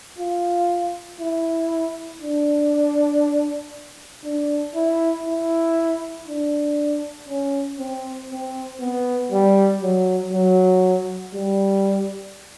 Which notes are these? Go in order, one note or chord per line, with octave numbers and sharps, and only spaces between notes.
F4
E4
D4
D4
E4
E4
D4
C#4
C4
C4
B3
G3
F#3
F#3
G3